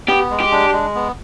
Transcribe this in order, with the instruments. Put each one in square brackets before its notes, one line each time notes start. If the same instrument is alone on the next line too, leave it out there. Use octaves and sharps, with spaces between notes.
[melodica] B3 [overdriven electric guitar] G4
[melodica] G#3
[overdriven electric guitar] G4
[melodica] D4
G#3
B3